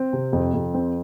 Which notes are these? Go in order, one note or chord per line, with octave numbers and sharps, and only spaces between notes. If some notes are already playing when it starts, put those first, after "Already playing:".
Already playing: C4
C3
F2
F2
C4